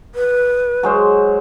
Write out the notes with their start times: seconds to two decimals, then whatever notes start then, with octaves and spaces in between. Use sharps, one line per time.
0.15 B4
0.83 F#3 G#3 C5